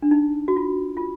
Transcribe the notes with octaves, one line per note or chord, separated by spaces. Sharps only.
D4
D#4
F#4
F4
F4